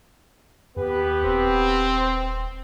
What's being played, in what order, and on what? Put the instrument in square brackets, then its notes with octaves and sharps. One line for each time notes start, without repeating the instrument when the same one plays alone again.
[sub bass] D#2 [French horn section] B3 G4 B4
[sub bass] D#1 [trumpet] C4